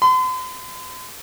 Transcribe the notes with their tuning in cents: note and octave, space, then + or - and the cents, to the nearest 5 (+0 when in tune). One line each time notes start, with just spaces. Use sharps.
C6 -45